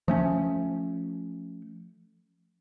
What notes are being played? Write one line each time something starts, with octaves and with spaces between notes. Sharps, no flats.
F3 A3 C#4